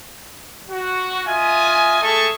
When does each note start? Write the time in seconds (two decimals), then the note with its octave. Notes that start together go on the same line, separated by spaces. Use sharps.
0.70 F#4
1.27 F4 D#5 E5 G#5
2.02 A3 G#4 A4 E5 A5 C#6